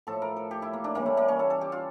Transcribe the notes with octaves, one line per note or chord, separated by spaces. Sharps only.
A2 F3 A4
A#4
A4
G4
E4
A#3
D4
C#3 E3 G3 A#3
A3
A#3
C#4
A4
A4
G4
F4